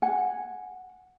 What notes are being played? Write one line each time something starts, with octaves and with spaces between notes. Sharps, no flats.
F#5 G#5